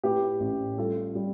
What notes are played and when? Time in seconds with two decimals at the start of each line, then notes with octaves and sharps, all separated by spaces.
0.04 A2 G4 B4
0.40 A1
0.78 G3 F4 A4
1.15 G3